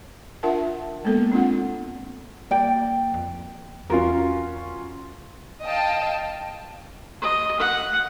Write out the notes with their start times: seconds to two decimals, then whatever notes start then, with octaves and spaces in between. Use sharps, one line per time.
0.43 D4 F4 A#4 E5 F#5 A5
1.05 G#3 A#3 B3 A4
1.32 C4 D4 F4 F#5
2.51 A#3 D5 G5
3.14 F2
3.90 E2 C#4 F4 F#4 A#4 F5
5.63 D#5 F5 G5 A5
7.22 D#5
7.60 F#5